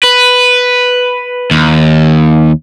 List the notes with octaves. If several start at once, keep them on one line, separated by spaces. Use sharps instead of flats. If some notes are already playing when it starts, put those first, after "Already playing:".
B4
D#2